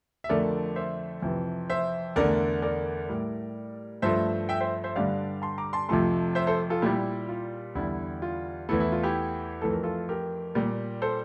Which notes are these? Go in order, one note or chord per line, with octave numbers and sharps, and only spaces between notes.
E5
F2 D3 A3 A#4 D5
C5 E5
F2 C3 E3
C5 E5
E2 D3 A3 A#4 D5
A#4 D5
A2 G3
G2 F3 A3 C5 E5
E5 G5
C5 E5
C5 E5
G2 D3 G3 D5 F5
A5 C6
A#5 D6
A5 C6
F2 C3 F3 A3 A5 C6
C5 E5
A4 C5
F4 A4
A#2 G3 E4 G4
F4
E2 D3 G3 E4
F4
E2 E3 A3 E4
E4
F4
E4 G4
F2 E3 A3 A4
A#4
F4 A4
G4 A#4
A#2 G3
A4 C5